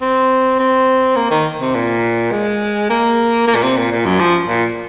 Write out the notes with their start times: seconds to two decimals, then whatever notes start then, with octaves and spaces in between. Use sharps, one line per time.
0.01 C4
0.59 C4
1.16 A#3
1.31 D#3
1.60 C3
1.75 A#2
2.32 G#3
2.90 A#3
3.47 A#3
3.55 A#2
3.63 C3
3.77 A#2
3.92 A#2
4.05 F#2
4.20 F3
4.49 A#2